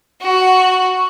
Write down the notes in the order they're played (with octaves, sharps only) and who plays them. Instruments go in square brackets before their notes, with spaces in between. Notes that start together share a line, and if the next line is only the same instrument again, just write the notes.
[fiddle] F#4